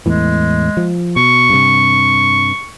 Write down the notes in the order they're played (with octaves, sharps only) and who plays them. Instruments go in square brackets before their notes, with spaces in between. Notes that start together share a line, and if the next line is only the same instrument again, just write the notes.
[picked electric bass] E2 A2 E3 [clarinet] G#3
[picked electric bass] F3
[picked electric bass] B2 [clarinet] C#6
[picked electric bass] G2 C3